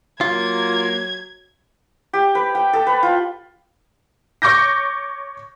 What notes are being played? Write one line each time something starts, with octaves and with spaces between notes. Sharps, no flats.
F#3 A#3 F4 G#6
G4
B4
G5
A4
B4
F4
C#5 C#6 D6 G6 A#6